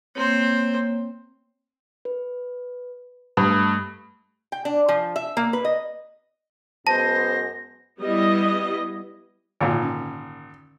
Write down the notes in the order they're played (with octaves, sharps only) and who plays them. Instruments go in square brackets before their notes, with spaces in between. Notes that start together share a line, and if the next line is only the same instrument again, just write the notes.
[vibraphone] A#3 C#5 [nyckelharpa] C4 C5
[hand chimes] B4
[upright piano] G2 [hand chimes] A3 D#6
[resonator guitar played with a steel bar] G5
D4
F3
E5
A#3
B4
D#5
[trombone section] F#2 G#3 B3 [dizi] C5 [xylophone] A5 [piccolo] A#6
[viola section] G3 B3 E4 D#5
[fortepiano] G#1 A#2 [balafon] D3 F5
[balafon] C#4